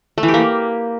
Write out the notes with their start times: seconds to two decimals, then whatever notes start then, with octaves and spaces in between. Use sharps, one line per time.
0.18 A3
0.23 E3
0.28 G4
0.34 A#3